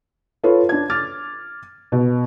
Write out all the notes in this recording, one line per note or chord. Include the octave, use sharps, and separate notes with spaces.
F4 A4 B4 C#5
D4 G#6
D6 F6 A6
B2